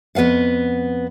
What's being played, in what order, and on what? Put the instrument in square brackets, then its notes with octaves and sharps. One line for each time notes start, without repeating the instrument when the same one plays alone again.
[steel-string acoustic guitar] F2 B3 B4 F5 F#5